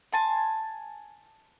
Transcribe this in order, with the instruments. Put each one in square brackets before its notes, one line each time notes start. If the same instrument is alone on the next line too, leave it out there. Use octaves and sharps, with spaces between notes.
[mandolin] G#5 A5 C6